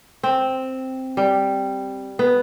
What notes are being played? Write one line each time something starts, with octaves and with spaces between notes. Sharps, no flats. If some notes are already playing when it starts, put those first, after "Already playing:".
C4
G3
B3